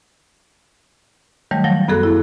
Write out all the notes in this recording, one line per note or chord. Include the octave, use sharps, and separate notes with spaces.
D#3 F#3 G3 A3 C#5
F3 F#3 A3
F#2 B3 F#4 G#4 A4 F#6
E4